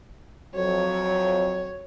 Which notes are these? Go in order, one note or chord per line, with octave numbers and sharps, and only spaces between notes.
F2 F#3 C#5